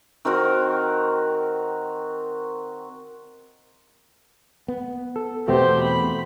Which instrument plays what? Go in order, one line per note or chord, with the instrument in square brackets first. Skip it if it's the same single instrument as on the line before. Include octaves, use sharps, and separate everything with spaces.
[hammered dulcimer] D#3 C4 F#4 A#4
[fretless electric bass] B3
[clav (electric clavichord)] A4
[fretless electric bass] E2 B3 [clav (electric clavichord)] B2 A3 C4 [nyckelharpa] G4 C5
[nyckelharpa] B5